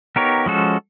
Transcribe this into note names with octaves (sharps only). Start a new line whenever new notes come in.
B3 D#4 G4 A#4 C#5
F3 G#3 C#4 F#4 A4